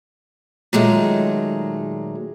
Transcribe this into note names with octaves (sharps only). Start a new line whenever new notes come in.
A#2 D#3 F#3 G#3 A3